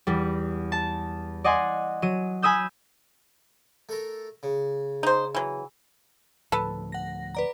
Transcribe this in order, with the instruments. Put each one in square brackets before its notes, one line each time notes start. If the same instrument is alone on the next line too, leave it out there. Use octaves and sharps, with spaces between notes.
[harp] E2 G3
A5
D5 D#5 F#5 G#5 C6
F#3 D#7
G#5 B5 D#6 E6 G6
[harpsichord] A3 A4 A#4
C#3
[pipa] D#4 C5
E3 F#3
[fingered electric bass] D2 A2 F3 [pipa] A4 B4
[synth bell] F#5 A#6
B4 D5 A#5